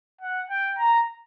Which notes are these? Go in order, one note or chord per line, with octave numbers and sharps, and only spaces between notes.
F#5
G5
A#5